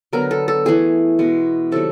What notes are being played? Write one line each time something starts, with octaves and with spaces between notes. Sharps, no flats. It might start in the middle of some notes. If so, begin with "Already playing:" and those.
D3 F#3 B3 A#4
A4
A4
E3 A3 G#4
B2 G#3 B3
C3 D#3 F#3 A4